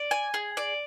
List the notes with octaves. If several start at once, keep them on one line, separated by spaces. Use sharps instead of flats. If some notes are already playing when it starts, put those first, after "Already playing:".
Already playing: D5
G#5
G#4
D5